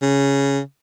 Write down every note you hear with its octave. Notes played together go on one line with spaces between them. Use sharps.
C#3